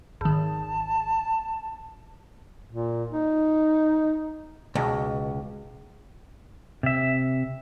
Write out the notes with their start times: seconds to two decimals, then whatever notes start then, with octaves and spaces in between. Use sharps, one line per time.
0.21 G#1 D#3 A5
2.69 A#2
3.10 D#4
4.75 C#2 B2
6.83 C3 E5